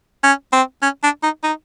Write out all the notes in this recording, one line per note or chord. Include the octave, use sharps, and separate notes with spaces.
C#4
C4
C#4
D4
D#4
D#4